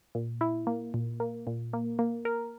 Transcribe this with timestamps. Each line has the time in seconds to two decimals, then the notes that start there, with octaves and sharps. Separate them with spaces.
0.15 A#2
0.41 E4
0.67 A#3
0.94 A#2
1.20 A#3
1.47 A#2
1.73 A#3
1.99 A#3
2.25 A#4